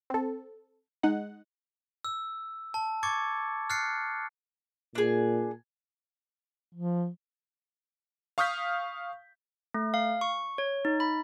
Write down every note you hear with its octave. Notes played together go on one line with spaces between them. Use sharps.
C4 A4
G#3 D#4 F#5
E6
A5
C#6 D6 G#6 A6 C#7
F6 F#6 A6 C7 C#7
A#2 D4 G#4
F3
F5 C#6 D#6 F6 G6 B6
A3
F5
C#6
C#5
D#4
B5